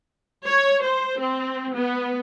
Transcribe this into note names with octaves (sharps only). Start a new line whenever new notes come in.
C#5
C5
C4
B3